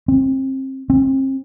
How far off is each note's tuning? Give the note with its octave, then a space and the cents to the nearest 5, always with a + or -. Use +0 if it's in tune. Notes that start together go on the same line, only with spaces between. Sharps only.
C4 +30
C4 +35